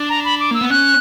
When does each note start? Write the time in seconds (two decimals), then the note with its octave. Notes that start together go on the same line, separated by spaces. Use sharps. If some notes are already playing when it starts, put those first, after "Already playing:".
Already playing: D4
0.09 A#5
0.24 B5
0.39 D6
0.51 A#3 E6
0.61 B3
0.70 C#4 F#6